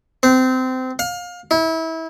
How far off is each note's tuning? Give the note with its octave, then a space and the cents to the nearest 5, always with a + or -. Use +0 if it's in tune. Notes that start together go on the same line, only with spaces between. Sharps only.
C4 -25
F5 +25
E4 -30